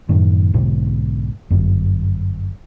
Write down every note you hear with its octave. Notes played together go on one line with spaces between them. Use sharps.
F#2 A2 D#3
B1 G#2 B2 D3
G1 F#2